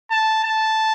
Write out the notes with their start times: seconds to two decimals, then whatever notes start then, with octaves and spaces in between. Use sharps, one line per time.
0.11 A5
0.44 A5